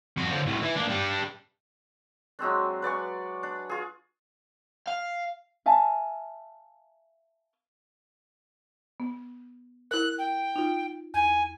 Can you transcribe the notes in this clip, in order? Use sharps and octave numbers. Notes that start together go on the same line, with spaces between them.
F2 F#4
D3 F3
C2 A2
E3
A#3 D4
G3 D4
F#3 G#3 C4 D4
B4 D5 G#5 C#6
D4
F4 G#4
F5
E5 F5 G#5 A5
B3
E4 A#4 F#6
G5
D#4 F4
E2 G#5